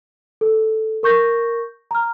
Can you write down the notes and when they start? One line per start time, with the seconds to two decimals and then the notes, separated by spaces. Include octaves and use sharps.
0.41 A4
1.03 A#4 C#6 G6 A#6
1.91 A#5 F6